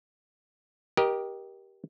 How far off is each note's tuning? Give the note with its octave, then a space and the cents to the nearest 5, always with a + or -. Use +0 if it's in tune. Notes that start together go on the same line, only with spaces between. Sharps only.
G4 -5 A#4 +25 D#5 +0